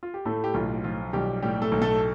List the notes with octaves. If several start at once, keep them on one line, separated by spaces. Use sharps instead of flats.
F4
G4
A2 A3 A4
G4
B1 F4
F3 F4
B1 G3 G4
A2 G3 G4
A3 A4
B1
A3 A4